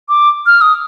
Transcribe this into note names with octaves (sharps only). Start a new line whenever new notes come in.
D6
F6
D#6